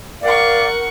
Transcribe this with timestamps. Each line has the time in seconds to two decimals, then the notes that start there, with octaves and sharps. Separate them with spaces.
0.23 A#4 D5 F5 F#5 C#6 D6